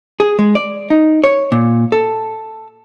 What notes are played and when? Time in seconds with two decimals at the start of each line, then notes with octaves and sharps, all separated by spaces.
0.20 G#4
0.39 G#3
0.55 D5
0.90 D#4
1.24 C#5
1.52 A#2
1.92 A4